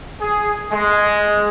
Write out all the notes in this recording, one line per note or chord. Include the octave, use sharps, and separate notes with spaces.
G#4
G#3